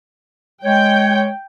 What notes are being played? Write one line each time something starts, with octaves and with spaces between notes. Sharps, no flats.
G#3 C#5 G5